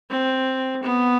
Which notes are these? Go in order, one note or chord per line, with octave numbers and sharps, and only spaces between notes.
C4
B3